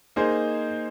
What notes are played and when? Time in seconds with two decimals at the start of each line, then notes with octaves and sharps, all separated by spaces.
0.16 A#3 D#4 G#4 C5